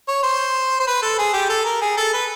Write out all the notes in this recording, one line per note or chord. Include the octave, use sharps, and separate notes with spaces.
C#5
C5
C5
B4
A4
G#4
G4
A4
A#4
G#4
A4
B4